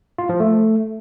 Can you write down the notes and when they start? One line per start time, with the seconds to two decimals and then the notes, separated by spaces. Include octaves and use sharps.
0.18 F4
0.29 F3
0.40 A3